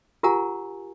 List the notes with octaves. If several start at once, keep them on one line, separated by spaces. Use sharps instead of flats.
F4 G4 A#4 F#5 G#5 A#5